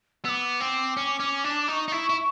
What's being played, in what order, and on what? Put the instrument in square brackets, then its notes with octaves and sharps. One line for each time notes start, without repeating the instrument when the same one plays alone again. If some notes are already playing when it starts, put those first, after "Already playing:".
[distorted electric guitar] B3 [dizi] D6 E6
[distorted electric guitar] C4
C#4
C#4
D4
[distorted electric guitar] D#4 [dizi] C#6 D6
[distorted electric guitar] D#4
E4
E4